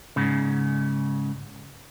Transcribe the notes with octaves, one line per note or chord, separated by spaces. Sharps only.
G#2 C#3